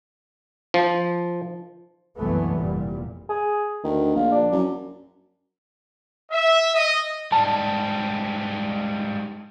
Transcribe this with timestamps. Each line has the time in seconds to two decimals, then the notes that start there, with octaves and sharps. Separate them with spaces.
0.74 F3
2.17 G1 C2 F#2 E3 A3 B3
2.54 F1 A#2 G3
3.29 G#4
3.84 D2 D#3
4.16 A#1 F4
4.31 D4
4.52 F#2
6.31 E5
6.74 D#5
7.32 G#2 G3 A5